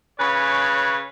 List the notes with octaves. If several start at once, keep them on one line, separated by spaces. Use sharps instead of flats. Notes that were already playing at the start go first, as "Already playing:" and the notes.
C#3 B4 C#5